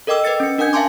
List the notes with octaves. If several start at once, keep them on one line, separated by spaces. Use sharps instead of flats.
A4 A#4 D#5 G5 D6 E6
B4 D#5 E6 A6 C#7
C#4 C#7
D4 A#4 F#5 G#5 G6 G#6
E5 F5 G#5 A5 C6 D6